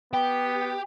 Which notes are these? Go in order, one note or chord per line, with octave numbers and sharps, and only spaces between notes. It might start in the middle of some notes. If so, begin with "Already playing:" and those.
B3 G4